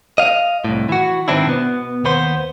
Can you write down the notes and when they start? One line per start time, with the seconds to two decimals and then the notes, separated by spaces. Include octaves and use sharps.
0.18 D#5 F5
0.64 C2 A2
0.89 E3 F#4
1.28 G#2 D#3 E3 C4 D4 E4
1.47 B2 B3
2.05 D#2 B3 C5 C6